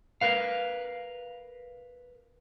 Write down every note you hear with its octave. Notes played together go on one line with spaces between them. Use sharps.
A#4 B4 F5